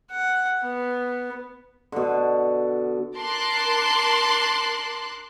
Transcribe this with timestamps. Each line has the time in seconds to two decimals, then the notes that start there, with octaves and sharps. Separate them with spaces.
0.11 F#5
0.63 B3
1.92 B2 D3
3.18 A#4 A5 C6 D6 F#6